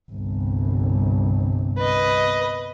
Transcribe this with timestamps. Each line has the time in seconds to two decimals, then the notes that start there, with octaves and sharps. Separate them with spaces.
0.11 G1 C2
1.77 B4 D#5